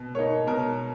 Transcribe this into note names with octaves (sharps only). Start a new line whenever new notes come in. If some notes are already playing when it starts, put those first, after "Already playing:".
Already playing: B2
A#3 D#4 C#5
B2 A#4